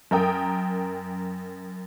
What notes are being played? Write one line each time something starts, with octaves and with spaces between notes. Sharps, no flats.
F#2 A#4 G5 D#6